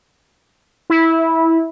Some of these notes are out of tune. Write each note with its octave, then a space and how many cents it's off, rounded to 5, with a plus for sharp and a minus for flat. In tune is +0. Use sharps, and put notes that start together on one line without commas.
E4 -15